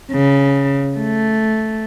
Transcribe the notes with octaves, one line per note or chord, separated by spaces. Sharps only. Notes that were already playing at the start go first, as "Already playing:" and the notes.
C#3
A3